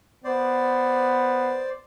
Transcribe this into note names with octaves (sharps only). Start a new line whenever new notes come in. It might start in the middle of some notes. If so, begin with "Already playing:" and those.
B3 C5 D5